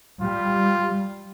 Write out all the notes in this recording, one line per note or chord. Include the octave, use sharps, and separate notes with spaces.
G3 F4